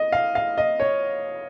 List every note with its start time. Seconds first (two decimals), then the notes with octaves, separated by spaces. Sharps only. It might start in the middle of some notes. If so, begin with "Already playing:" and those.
Already playing: D#5
0.12 F5
0.35 F5
0.58 D#5
0.80 C#5